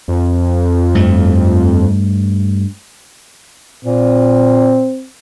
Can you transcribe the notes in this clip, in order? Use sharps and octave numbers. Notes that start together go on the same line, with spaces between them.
F2
G2 A3
A#2 C4